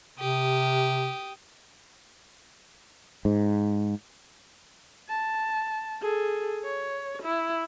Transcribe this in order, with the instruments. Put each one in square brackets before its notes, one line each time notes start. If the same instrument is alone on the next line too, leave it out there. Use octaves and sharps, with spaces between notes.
[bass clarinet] C3 [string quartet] G4 D#6
[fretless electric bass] G#2
[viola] A5
G#4 A4
C#5
E4